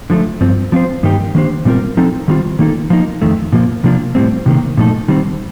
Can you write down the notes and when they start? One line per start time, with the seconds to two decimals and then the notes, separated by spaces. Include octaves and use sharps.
0.10 D3 F3 A3
0.41 G2 F3 C4
0.72 F3 C4 F4 C5
1.03 G2 D#3 A#3 D#4 G4
1.35 D#3 A#3 D4 G4 C5
1.65 A#2 G3 C4 F4 A#4
1.97 F3 C4 D#4 A4
2.28 D#3 G3 C4 F4
2.59 D#3 A#3 D#4 A4
2.90 F3 A#3 D#4
3.22 F2 D#3 A3
3.53 A#2 F3 A#3
3.84 C3 F3 A#3 D4 F4
4.15 A2 G3 C4
4.46 C3 D#3 A#3
4.77 A#2 F3 A3 D#4 A4
5.08 D#3 G3 C4